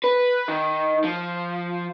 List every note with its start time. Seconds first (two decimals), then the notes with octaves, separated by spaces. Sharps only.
0.04 B4
0.48 D#3
1.04 F3